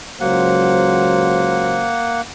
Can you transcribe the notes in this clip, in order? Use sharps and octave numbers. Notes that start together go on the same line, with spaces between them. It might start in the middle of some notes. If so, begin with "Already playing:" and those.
C#2 F#3 A#3 C5 F#5